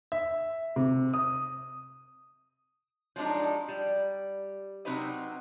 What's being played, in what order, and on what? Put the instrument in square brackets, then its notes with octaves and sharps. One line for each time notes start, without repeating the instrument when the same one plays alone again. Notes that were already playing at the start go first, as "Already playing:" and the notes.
[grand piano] E5
C3
D#6
[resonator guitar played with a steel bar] F3 F#3 G#3 D4 D#4
G3
C3 F#3 C4 D#4 B4 D#5